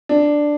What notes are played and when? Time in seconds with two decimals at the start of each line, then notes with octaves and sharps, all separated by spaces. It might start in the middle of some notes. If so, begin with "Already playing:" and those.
0.09 D4